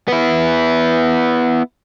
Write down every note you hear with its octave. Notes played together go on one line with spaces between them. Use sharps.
B3 E4